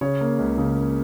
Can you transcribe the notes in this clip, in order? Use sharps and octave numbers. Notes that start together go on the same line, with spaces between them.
C#3 C#5
A#3
C#2
C#3
A#3